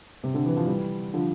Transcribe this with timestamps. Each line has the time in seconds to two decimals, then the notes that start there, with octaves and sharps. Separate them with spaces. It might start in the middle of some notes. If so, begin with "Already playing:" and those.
0.24 C3
0.34 D3
0.46 E3
0.57 F3
0.67 E3 G3
1.14 D3 F3